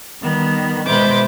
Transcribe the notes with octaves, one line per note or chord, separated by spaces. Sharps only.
D#3 G3 B3
B2 G#3 B4 C5 E5 D6